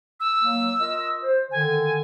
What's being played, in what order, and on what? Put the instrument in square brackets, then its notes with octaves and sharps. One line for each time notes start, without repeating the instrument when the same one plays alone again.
[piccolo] E6
[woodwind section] F#3 A#3
F4 A#4 D#5
C5
[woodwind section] D3 D#3 [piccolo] G#5